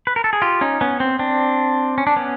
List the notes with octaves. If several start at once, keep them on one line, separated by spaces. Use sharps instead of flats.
B4
A#4
A4
G#4
F4 G4
C#4 D#4
B3 C#4
C4
C4 D4
C#4
D4
B3 C#4